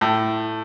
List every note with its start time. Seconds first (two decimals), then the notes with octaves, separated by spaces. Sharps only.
0.01 A2